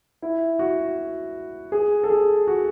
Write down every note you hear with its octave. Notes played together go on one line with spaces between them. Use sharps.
E4
F#4
G#4
A4
G#4
F#4